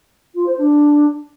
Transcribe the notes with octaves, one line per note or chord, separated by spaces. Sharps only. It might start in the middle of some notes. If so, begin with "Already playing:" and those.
F4
C5
D4